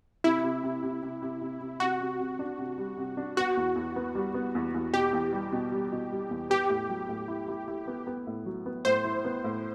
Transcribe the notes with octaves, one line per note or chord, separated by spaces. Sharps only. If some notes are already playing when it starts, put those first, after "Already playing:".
C3 E4
C3
C3
C3
C3
C3
C3
C3
C3 F#4
C3
C3
D4
C3
G3
C3
D4
B3 F#4
E2
E2
B3
G3
B3
E2
E2
B2 G4
E2
G3
B2
G3
B2
G3
E2
B3 G4
A2
F#3
A2
E4
E4
E4
B3
B3
A2
F#3
B3
A2 C5
E4
B3
A2